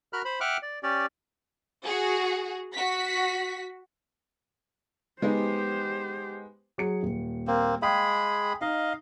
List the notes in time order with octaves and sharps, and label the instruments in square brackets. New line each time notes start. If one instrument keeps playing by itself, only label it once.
[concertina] F#4 A#4 B5 F6 F#6
C5 B5
E5 F#5 G5 D6 F6 F#6
D5
C#4 G4 D5
[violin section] F#4 G#4
F#4 B6
[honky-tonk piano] G#3 B3 D#4 [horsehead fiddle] G4 C5
[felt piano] F#3 G#4 C#7
D#1
[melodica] A#3 C4
[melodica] G#3 G#4 B5 [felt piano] F5 G5
[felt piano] D#4 [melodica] D#5 F5